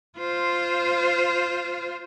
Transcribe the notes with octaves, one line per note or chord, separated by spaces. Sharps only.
F4 C5